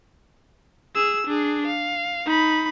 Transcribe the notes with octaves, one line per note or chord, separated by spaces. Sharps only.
G#4 E6
D4 G#4
F5
D#4 B5